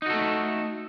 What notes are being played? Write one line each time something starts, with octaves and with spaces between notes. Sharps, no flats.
A3 D#4 F#4 A4